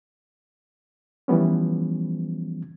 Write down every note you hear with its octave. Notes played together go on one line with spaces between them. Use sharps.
E3 F3 G3 B3 C#4